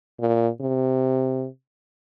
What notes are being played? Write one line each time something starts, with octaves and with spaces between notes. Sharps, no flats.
A#2
C3